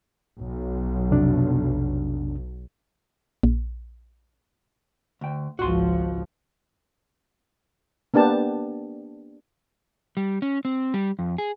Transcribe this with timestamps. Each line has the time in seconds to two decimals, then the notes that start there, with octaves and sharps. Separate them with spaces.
0.39 B1
1.11 F2 C3 D4
3.43 A#1
5.21 D2 G5
5.59 G#1 C#2 F3 F#4 C6
8.14 A#3 B3 D4 G4 A5
10.17 G3
10.42 C#4
10.65 C4
10.94 G3
11.19 F2
11.38 G#4